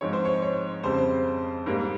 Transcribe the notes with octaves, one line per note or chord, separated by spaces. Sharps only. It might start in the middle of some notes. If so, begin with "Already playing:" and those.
G#2 F3 G#3 C4 C#5
C5
C#5
C#5
F2 C#3 G3 C4 C5
G#2 G3 A#3